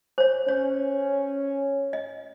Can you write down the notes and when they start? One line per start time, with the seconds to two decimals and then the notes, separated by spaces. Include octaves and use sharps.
0.18 C5 C#5
0.48 C#4 C#5
1.93 D#5